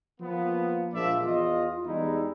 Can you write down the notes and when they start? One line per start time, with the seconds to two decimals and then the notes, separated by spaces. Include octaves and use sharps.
0.21 F3 A#3 B3
0.93 A#1 F3 G#3 A#3 D5 E5
1.24 E2 F4 D#5
1.85 E2 G3 G#3 D#4 E4